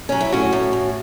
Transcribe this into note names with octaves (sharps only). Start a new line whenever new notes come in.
F#3 C#4
E4
A2 C#4 F#4
A2
A2